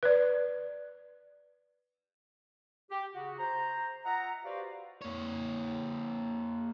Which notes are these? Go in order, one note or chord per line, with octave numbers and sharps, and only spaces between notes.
B4 D5
G4
C#3 F#4
C5 A#5
F4 D#5 E5 F#5 A#5
F#4 G4 B4 C5 D5 F5
A#3 C#5